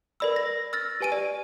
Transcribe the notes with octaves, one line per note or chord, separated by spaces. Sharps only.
A#4 B4 D5 B5 E6
A#6
E6 F6 A6 A#6
G4 B4 G#5 D7 D#7
G4 D5